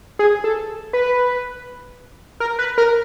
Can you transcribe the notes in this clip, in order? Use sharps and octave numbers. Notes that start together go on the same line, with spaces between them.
G#4
A4
B4
A#4
B4
A#4